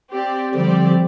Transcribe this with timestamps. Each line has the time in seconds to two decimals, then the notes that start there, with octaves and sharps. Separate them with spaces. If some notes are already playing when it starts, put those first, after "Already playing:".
0.12 C4 G4 D5
0.54 D3 F3 G3 C4 G4 D5